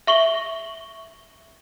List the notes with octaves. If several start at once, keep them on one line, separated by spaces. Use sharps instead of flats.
E5 C#6 F#7 G7